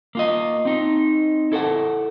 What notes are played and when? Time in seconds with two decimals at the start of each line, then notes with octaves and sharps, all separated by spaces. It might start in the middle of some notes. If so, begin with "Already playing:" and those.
0.15 A#3 F4 D#5
0.65 C4 D#4
1.52 E4 A4 A#4 C5 F#5